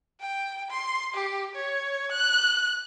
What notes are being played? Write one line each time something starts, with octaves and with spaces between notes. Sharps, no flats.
G5
C6
G4
C#5
F#6